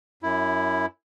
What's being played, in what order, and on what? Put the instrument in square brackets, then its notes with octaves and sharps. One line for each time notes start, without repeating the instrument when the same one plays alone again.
[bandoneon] F#2 E4